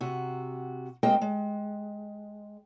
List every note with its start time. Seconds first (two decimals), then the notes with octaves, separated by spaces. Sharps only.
0.01 C3 F#4
1.03 G#3 A#3 C4 G4 D#5 G5
1.21 G#3